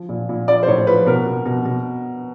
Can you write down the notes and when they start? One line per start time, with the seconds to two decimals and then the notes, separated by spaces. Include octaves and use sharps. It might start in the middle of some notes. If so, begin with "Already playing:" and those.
Already playing: F3
0.09 A#2
0.29 A#2
0.48 F3 D5
0.63 C5
0.67 A2 C#5
0.87 F3 B4
1.06 B2 A#4
1.26 B2
1.46 B2
1.65 B2